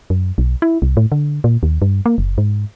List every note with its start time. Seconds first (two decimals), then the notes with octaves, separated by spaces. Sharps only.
0.10 F#2
0.38 B1
0.62 E4
0.82 C2
0.97 A2
1.12 D3
1.44 A#2
1.63 D#2
1.82 G2
2.06 A#3
2.18 F#1
2.38 G#2